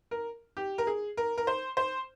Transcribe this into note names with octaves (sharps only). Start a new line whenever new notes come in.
A#4
G4
A#4
G#4
A#4
A#4
C5
C5